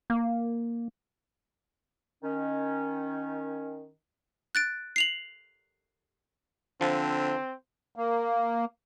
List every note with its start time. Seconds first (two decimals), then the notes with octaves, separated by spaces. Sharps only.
0.10 A#3
2.23 D#3 C#4
4.55 F#6 A6 D7
4.96 C7 F7 F#7
6.81 D3 F3 C4
7.96 A#3